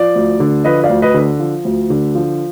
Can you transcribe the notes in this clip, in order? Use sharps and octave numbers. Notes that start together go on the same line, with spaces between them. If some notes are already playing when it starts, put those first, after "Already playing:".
Already playing: F3 D5
D2
D3
F3 B4 D#5
D5 F5
D2
B4 D#5
D3
F3
D2
D3
F3